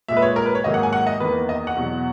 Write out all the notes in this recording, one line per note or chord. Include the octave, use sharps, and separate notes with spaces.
A#2 G#3 E5
B4
C#5
A#4
B4
C#5
G#2 D#3 F#3 A#3 D#5
F#5
G#5
F#5
D#5
E2 D#3 A#3 B4
D#5
F#5
E2 B2 F#3